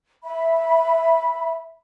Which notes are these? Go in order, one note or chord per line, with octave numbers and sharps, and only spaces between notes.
E5 B5